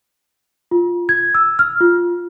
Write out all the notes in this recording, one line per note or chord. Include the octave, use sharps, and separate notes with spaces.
F4
G#6
E6
F6
F4